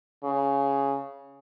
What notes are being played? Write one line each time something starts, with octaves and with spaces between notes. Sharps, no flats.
C#3